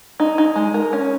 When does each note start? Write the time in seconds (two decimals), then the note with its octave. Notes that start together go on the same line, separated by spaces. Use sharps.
0.20 D#4
0.38 D#4
0.56 G#3
0.74 A#4
0.93 C#4